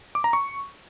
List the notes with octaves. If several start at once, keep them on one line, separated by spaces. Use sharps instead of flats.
D6
A#5
C#6